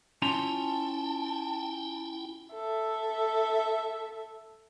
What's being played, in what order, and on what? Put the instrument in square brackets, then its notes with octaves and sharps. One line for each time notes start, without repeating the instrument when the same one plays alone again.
[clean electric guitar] C#4 F4 A#5 [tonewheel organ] E4 G5 [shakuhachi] A5
[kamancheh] A4 E5